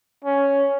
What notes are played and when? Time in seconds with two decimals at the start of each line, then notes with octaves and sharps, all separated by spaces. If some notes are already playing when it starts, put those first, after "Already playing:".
0.24 C#4